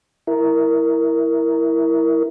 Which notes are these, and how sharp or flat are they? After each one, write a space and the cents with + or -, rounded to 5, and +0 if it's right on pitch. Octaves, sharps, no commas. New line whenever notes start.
E4 +0 A#4 +0